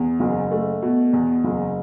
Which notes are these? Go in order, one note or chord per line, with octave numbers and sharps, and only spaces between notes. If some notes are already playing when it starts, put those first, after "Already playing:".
Already playing: E2
F#1
A3
B2
E2
F#1